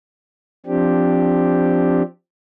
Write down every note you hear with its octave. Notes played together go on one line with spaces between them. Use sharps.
F3 C4 D4 G4